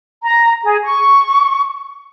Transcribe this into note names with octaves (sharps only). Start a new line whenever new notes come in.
A#5
G#4
C#6